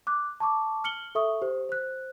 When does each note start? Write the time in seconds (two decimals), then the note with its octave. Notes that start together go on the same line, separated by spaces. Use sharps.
0.07 D6 F#6
0.40 A5 C#6 D6
0.84 F6 C#7 F#7 G7
1.15 A4 E5 C#6 D#6
1.42 G4 C5
1.69 C5 F#6